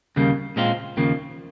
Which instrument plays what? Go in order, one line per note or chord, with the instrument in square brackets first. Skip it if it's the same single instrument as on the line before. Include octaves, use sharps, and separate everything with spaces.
[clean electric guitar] D#2 C#3 G3 A#3
A#2 G#3 C4 F4
D#2 C#3 F3 A#3